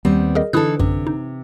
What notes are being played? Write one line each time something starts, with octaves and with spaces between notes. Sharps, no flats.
D#2 G3 B3 C4
G#4 A#4 D#5
D3 E3 D#4 E4 A4 D#6 F#6
A1 F#2 C3
D#4